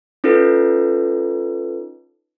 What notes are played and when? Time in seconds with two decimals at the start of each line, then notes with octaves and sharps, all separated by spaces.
0.24 C#4 D#4 F4 A4 B4